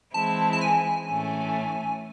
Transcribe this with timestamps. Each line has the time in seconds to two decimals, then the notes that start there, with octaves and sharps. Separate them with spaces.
0.14 E3 G#3 C4 E4 A5
0.53 A5
0.61 G#5
1.08 A2 E3 A3 C#4